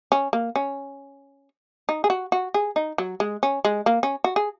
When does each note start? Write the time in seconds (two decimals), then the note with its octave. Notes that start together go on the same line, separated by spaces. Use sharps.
0.12 C#4
0.33 A#3
0.56 C#4
1.89 D#4
2.04 G#4
2.10 F#4
2.32 F#4
2.54 G#4
2.76 D#4
2.98 F#3
3.20 G#3
3.43 C#4
3.65 G#3
3.86 A#3
4.03 C#4
4.24 F#4
4.36 G#4